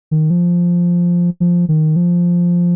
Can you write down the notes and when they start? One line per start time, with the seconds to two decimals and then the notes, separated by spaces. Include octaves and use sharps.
0.11 D#3
0.30 F3
1.40 F3
1.69 D#3
1.96 F3